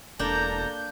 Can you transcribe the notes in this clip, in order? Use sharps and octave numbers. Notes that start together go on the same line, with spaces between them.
E1 A#3 D4 A4 A#5 G6